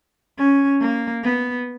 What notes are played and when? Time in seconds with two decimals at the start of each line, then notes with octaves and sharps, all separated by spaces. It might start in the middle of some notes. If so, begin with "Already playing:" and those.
0.38 C#4
0.81 A#3
1.23 B3